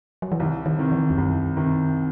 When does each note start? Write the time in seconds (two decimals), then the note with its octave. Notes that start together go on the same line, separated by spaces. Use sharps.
0.22 F#3
0.32 E3
0.40 C2 D#3
0.66 D#3
0.78 C3 D#3
0.92 E3
1.10 E2
1.17 C2 F#2
1.57 C3 D#3